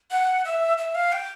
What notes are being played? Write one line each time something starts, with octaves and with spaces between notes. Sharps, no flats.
F#5
E5
E5
F5
G5